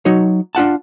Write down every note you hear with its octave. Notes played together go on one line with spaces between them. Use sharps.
F#3 D#4 F#4 C#5
D4 F4 F#5 A5